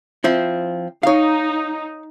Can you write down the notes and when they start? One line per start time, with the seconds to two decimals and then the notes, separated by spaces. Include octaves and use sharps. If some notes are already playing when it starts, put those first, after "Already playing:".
0.24 F3 C4 E4
1.03 D#4 C#5 F5